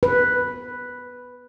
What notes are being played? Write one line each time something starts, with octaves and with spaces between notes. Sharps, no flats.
B4